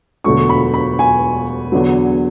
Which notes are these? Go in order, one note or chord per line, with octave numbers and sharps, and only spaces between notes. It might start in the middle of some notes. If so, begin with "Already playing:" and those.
E1 D2 D3 F#3 A3 C#6
B5
B5
G#5
E2 D3 F#3